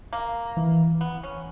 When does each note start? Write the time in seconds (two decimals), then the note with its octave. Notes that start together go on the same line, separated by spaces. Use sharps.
0.13 A#3
0.57 E3
1.01 B3
1.23 C#4